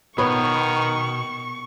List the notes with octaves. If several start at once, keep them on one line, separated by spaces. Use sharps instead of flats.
B2 D#3 B3 C#5 C#6